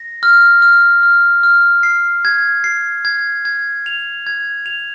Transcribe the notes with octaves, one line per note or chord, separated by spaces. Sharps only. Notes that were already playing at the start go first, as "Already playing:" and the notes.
Already playing: A#6
F6
F6
F6
F6
C7
G#6
C7
G#6
G#6
F7
G#6
F7